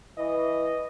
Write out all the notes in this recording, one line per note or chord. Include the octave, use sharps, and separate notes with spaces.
E3 D#5